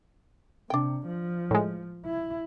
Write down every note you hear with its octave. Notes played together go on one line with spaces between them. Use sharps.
C3 D4 G5
F3
A2 G#3
E4